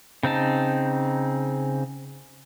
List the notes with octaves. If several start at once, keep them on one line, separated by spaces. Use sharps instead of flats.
C#3 C4 D#4 A5